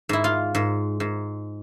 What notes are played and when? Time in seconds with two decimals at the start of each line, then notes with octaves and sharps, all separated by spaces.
0.09 G#2 E4
0.24 F4
0.55 G#2
1.00 G#2